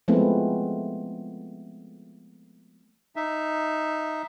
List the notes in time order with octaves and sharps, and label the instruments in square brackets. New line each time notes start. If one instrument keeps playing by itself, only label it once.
[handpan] F3 G#3 A3 B3 C4 E4
[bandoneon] D#4 E5